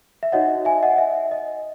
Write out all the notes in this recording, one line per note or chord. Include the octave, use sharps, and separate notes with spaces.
E5
D#4 F#4 C#5 D#5 F#5
E5 G#5
D#5 F#5
E5
D#5